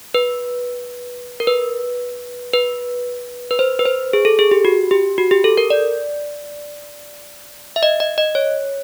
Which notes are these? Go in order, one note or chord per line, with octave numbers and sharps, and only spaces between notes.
B4
A#4
B4
B4
B4
C5
B4
C5
G#4
A4
G#4
G4
F#4
G4
F#4
G4
A4
A#4
D5
E5
D#5
D#5
D#5
C#5